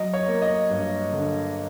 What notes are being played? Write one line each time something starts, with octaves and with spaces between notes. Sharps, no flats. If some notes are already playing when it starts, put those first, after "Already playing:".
Already playing: F#3 D#5
C#5
A#3
D#5
G2
D3